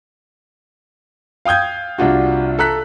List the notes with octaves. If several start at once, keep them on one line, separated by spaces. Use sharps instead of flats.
F5 G5 D#6 G6 G#6
C2 D4 F4 F#4
A4 A#5 F#6 B6